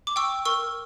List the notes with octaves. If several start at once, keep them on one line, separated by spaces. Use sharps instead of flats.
D6
G5 C#6 E6
A#4 C#6 E6